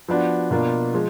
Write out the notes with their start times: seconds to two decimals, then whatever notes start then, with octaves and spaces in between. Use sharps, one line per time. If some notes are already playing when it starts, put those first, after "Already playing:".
0.08 F3 B3 D4 F#4
0.51 B2 A#3 D4 F4
0.94 F3 G#3